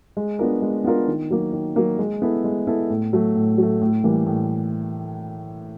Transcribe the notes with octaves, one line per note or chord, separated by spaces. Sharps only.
G#3
B3 D4 F4 A#4
G#3
B3 D4 F4 A#4
D#3
F#3 A#3
D#3
F#3 A#3
G#3
B3 E4 A4
G#3
B3 E4 A4
A2
F#3 A3
A2
F#3 A3
A2
E3 G3 A#3
A2